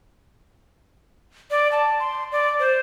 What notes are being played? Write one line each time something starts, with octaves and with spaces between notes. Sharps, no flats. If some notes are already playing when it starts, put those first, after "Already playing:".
D5
A5
C6
D5
C5